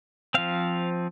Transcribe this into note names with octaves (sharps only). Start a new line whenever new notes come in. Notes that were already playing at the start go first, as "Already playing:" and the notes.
F3 C4 F5